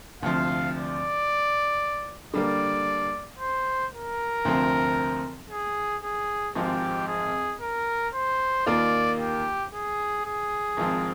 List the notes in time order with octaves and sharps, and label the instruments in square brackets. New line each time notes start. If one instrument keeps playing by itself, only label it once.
[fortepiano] D2 C3 F3 [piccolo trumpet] F5
[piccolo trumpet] D5
[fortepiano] D3 G3 A#3 [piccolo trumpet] D5
[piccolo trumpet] C5
A#4
[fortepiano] D2 C3 F3 C4
[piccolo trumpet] G#4
G#4
[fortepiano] G#1 G#2 F3 C4 [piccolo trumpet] G4
[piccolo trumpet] G#4
A#4
C5
[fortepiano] D#2 D#3 A#3 F4 A#4 [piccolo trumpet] D5
[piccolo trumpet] G4
G#4
G#4
[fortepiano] G#1 G#2 F3 C4